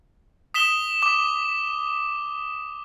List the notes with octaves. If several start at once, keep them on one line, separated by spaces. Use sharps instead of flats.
D#6 B6 E7 G7
D6